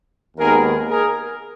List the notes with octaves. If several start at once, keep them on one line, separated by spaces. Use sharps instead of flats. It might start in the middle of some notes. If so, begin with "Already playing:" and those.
D#2 D#3 G#3 B3 G#4 A#4
G#4 A#4